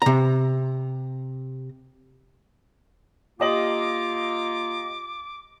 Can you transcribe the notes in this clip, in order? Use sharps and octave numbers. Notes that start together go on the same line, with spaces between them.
C3 A#5
A#3 F4 G4 D#5 D6 F#7